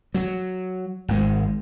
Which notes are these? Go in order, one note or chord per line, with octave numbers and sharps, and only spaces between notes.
F#3
G#1 G#3